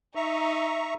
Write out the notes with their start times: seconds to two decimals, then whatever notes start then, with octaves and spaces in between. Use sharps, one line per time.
0.15 D#4 E5 A#5 C#6